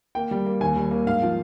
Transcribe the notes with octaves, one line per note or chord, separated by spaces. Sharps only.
A#3 G5
G3
A#3
D#2 G#5
G3
A#3
G#2 F5
F3